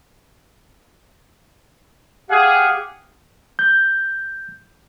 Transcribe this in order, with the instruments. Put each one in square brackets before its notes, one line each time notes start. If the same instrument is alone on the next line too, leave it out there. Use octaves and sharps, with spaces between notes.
[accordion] G4 F5 F#5 [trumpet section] G#4
[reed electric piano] G6